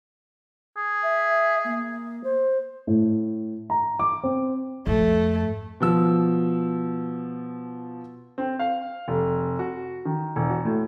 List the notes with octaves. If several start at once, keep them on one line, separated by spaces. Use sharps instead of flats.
G#4
E5
A#3
C5
A2
A#5
D6
C4
F2 G#2 A3
B2 F3 E6
C4
F5
F1
F#4
D#3
E1
F#4
A2